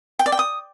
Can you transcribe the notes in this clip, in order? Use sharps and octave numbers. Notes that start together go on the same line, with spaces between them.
G5
D5
G5
D#6